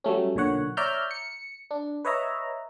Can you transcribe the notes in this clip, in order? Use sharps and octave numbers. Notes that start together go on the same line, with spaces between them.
F#3 G3 A3 C#4
B1 A#2 D3 C#5 F#5
C#5 D5 E5 A#5 F6 G6
C#7
D4
B4 C#5 D#5 E5 A#5